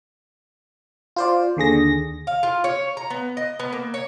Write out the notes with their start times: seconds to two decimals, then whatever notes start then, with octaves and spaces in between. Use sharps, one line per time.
1.16 F4 C5 D5
1.57 D#2 D3 G#4 A#6
2.27 F5
2.43 F4
2.64 C#5
2.97 A#5
3.10 B3
3.37 D#5
3.60 B3
3.72 A#3
3.94 C#5